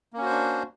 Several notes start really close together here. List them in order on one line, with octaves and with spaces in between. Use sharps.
A#3 C#4 F#4 C5 D4